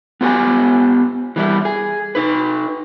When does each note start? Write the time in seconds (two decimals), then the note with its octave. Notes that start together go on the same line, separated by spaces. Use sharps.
0.21 B3 F4 G4 F5 G#5
1.36 E3 G3 E4
1.65 G#4
2.15 D#4 B4